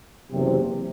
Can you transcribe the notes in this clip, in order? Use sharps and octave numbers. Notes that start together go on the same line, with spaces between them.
F#1 E2 C3